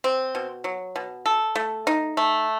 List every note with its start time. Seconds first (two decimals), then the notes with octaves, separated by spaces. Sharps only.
0.04 C4
0.35 B2
0.64 F#3
0.96 B2
1.26 A4
1.56 A3
1.87 D#4
2.17 A3